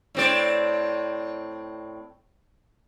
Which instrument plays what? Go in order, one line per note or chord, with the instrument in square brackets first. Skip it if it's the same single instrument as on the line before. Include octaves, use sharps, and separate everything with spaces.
[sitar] A2 C4 D5